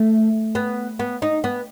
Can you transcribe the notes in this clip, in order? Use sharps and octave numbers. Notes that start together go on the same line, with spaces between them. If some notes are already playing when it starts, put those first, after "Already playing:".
Already playing: A3
B3
B3
D#4
B3